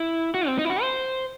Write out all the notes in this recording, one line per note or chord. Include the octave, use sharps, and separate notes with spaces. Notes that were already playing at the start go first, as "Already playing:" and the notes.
Already playing: E4
F#4
C4
D#4
E4
F#4
C5